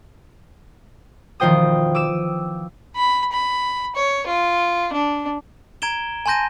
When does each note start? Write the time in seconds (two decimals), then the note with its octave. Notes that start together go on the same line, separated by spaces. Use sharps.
1.40 E1 D#3 F3 C5 G5 D#6
1.95 D6 E6 D#7 E7
2.96 B5
3.32 B5
3.95 C#5
4.27 F4
4.93 D4
5.82 A#5 G#6 D7 E7 G7
6.26 G#5 A5 C6 G6 A#6 D#7